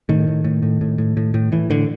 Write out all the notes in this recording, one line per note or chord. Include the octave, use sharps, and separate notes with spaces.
A2 D#3
A2
A2
A2
A2
A2
A2
A2
A2 E3
A2 D3